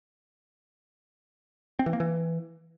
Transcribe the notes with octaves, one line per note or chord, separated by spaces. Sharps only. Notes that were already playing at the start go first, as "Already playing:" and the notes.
C4
E3
A#3
E3